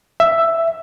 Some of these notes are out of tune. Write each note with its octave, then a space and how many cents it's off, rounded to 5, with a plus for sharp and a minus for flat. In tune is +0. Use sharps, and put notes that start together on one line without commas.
E5 +5